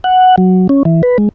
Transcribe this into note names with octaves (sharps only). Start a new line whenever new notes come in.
F#5
F#3
C#4
E3
B4
G#3